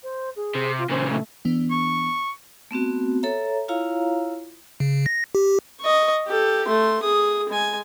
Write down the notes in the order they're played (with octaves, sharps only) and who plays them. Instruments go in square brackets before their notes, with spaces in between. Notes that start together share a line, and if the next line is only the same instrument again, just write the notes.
[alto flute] C5
G#4
[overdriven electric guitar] C3
[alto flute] F4
[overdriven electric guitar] A#2 C#3 [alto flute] C5
[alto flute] A3
[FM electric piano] E3 B3 D4
[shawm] C#6
[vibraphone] A3 B3 C4 F#4
A4 C#5 E5 A#5
E4 F4 C#5 F5 A#5
[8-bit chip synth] C#3
A#6
G4
[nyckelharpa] D#5 C#6
G4 A4
A3 C6
G#4 D#6
G#3 G#5